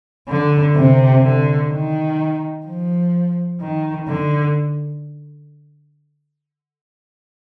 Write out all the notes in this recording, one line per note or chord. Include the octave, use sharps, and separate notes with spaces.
D3
C3
D3
D#3
F3
D#3
D3